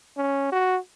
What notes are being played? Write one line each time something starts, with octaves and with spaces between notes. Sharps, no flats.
C#4
F#4